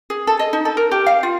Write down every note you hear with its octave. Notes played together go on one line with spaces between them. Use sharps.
G#4
A4
D#5
D#4
A4
A#4
G4
F5
F4